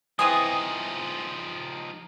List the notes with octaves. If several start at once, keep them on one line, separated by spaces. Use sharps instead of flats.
E3 F3 C4 D#4 G#4 D#6